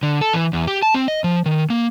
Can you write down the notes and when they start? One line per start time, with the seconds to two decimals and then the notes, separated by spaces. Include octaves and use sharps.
0.03 D3
0.21 A4
0.33 E3
0.53 E2
0.67 G4
0.82 A5
0.94 C4
1.08 D#5
1.24 F3
1.46 D#3
1.70 A#3